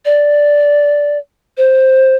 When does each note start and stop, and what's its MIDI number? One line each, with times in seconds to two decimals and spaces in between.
0.05 1.18 74
1.57 2.16 72